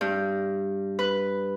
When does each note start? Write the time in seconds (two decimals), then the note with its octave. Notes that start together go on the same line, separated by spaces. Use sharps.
0.01 G2
0.99 B4